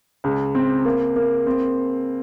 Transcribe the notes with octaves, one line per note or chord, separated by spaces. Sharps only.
C#2
C4
A#3
A#3
C4